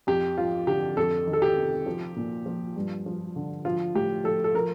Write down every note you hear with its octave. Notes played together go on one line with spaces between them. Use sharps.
F2 G4
F3 F4
D3 G4
F2 A4
D#3
A4
G4
C3
F3
A#2
F3
G2
F3
D3
F3 F4
A2 G4
F3 A4
A4
F3 A#4